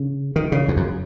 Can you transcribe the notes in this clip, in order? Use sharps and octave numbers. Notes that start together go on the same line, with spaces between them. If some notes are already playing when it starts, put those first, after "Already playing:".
Already playing: C#3
D#3
C#3
E2
F#2